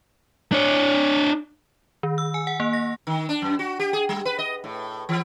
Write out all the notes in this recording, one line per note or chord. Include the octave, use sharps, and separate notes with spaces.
D4 C#5
D#3
E6
G#5
F#5
A#3
A#6
D#3
D4
F#2
F#4
G4
G#4
G3
B4
D#5
A2
E3